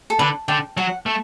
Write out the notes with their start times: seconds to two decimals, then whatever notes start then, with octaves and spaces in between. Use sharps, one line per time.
0.10 A4
0.19 D3 B4
0.48 D3 G5
0.77 F#3 F#5
1.06 A3